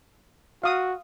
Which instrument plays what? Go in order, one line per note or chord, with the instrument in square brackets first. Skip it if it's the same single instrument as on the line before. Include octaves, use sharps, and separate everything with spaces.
[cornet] F#4 [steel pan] F5 D#6